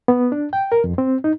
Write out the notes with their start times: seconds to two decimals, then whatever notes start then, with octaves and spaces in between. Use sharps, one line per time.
0.08 B3
0.32 D4
0.53 G5
0.72 A#4
0.84 F2
0.98 C4
1.24 D#4